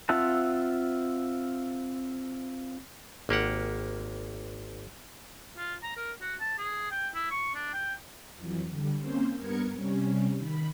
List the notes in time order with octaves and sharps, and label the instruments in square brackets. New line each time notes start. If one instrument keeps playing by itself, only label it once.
[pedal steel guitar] C4 F4 E5 F#5 A5
[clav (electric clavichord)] G#1 A#3 G4 F#5
[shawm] F4
A#5
A#4
F#4
A5
G#4
G5
E4
C#6
D4
G5
[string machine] F2 E3 F#3
D3 G3
A#3 C4 C#4 C5
G2 B3 A#4 G#6 C#7
C3 G3 C#4
D#3 B5